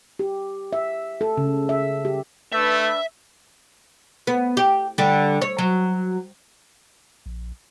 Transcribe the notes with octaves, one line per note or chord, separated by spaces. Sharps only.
G4
E5
A4
C#3
E5
G4
A3 D4 B4 E5 E6
B3
G4
D3 G3
C#5
F#3
A#1